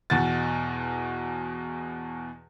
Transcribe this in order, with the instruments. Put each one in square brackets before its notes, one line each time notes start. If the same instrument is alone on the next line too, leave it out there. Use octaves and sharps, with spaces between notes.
[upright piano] E2 B2 F#4 A6